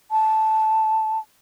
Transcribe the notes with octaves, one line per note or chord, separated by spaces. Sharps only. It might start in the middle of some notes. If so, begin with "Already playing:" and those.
A5